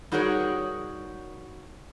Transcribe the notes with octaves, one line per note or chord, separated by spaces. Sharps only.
G3 D#4 F#4 G#4 A#4 C#5